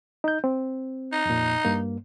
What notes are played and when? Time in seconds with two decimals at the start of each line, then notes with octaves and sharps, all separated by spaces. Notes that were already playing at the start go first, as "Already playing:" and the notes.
0.24 D#4 G6
0.44 C4
1.12 D#4
1.25 F2 A#2
1.65 G2 A#3